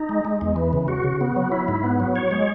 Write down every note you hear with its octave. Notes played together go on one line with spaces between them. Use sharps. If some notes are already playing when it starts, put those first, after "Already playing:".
Already playing: D#4
G#3
G#3
E2
E3
C#3
F#4
C#3
B3
F#3
E4
G#2
B3
F#3
C#5
G#3